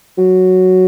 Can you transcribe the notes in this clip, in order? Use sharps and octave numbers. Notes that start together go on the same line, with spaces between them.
F#3